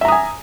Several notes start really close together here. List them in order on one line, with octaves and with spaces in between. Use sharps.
E5 A#5 D#6 G#5